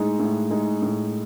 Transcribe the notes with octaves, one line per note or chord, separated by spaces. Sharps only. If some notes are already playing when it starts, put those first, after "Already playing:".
Already playing: A2 G#3 D#4
A2
G#3 D#4
A2